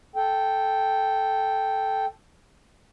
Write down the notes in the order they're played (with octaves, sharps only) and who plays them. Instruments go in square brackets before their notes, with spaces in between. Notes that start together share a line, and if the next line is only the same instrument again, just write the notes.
[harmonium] A4 G5